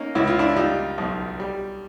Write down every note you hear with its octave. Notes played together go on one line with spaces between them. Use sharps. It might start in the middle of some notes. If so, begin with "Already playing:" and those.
Already playing: A#3 C#4 D#4
C#2 E4
F4
D4 E4
G3 D#4 F4
B1
G3